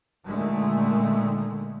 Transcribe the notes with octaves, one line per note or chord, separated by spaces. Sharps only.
A#2 D3 D#3 G#3 A3